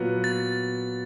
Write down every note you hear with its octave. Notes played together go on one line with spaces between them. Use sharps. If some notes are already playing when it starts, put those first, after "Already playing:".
Already playing: A#2 F#3 B3
A6